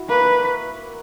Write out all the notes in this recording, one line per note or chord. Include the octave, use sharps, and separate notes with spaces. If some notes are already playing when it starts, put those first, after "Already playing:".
Already playing: E4 F#4 E5
A#3 B4